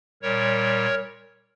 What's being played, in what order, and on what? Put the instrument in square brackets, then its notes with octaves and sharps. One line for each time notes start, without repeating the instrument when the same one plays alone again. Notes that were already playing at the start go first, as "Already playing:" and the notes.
[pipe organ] A#2 G3 A#4 C#5